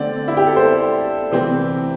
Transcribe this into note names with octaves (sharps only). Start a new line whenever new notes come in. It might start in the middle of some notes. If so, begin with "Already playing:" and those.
Already playing: D3 A3 C4 D5
E4
G4
A4
C5
C3 E3 C4